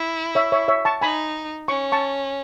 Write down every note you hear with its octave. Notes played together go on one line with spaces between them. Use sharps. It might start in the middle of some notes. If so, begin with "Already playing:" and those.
Already playing: E4
C#5 E5
C#5 E5
C#5 E5
A5 C#6
D#4 G#5 B5
C#4 C#6
A5 C#6